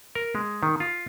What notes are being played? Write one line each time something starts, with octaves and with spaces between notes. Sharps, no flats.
A#4
G#3
D#3
F4